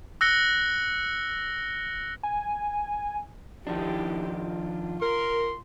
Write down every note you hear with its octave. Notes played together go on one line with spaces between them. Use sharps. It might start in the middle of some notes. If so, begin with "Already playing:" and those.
E6 F#6 A#6 C#7 G7
G#5
D#3 F3 D4 E4 G4
F4
A#4 C6